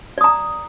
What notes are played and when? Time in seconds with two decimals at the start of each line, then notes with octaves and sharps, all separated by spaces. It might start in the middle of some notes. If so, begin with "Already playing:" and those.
0.18 D5
0.21 D#6
0.24 A#5